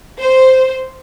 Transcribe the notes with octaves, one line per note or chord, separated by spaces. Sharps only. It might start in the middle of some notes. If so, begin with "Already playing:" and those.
C5